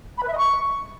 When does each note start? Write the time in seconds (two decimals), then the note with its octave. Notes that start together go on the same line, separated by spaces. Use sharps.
0.17 B5
0.22 B4
0.27 E5
0.33 D#5
0.38 C#6